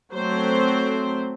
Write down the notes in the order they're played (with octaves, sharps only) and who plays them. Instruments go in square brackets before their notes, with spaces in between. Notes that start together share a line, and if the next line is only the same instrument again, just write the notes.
[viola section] F#3 A3 C4 C5